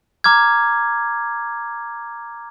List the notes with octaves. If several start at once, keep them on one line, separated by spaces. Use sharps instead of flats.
A#5 D6 F6 G#6